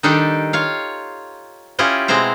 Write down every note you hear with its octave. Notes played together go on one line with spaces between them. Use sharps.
D#3 G3 D4 D#4 G4 A4
F4 C#5 F5
C#4 E4 F4 G4 D#5
B2 G#3 C4 E4 C5 A#5